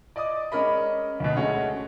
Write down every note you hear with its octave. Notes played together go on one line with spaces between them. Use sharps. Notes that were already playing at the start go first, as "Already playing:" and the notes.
D5 D#5 D6 D#6
G#3 C#4 A#4 D#5 B5
D2 B2
G#3 A3 C#4 F#4